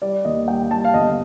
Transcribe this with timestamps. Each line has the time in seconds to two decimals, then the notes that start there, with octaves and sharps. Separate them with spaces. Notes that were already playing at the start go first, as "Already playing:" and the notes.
0.02 G3 D5
0.25 D#2 D#5
0.48 G3 G5
0.70 G3 A5
0.85 F5
0.94 G1 D#5